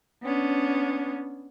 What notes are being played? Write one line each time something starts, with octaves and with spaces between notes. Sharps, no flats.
B3 C#4 D4